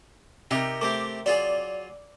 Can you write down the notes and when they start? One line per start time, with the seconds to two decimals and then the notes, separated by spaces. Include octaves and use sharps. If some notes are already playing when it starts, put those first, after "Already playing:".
0.51 C3 D#4 G4 A#4
0.81 A3 C4 G4 D6
1.26 F#3 F4 G#4 D5